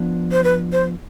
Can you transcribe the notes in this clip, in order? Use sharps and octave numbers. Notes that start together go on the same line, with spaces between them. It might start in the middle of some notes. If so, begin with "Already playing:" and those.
Already playing: F3 B3 D4
C5
B4
C5